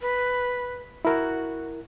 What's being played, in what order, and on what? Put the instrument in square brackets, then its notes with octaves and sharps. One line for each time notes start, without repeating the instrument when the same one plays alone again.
[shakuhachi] B4
[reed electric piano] E4 A#4 [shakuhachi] F#4